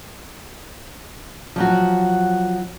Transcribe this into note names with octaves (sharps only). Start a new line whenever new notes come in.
F3 F#3 F#4